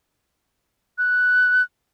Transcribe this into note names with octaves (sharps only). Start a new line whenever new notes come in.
F#6